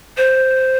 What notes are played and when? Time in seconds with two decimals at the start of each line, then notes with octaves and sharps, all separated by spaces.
0.17 C5